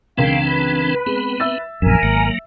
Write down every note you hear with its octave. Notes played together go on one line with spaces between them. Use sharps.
C#2 E3 C4 D4 A#4 F5 G5
B4
G#3 B3 C4
E5 E6 A6
A#1 F#2 E3 A#4 G#5
G#1 F#3 A#3